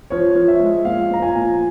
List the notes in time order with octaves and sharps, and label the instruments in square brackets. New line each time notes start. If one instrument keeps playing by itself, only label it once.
[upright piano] F3 [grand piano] C#5
[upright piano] F3
[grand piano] E5
[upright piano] G#3
[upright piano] A#2 [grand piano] F5
[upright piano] F3 [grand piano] A#5
[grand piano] G#5
[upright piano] A#2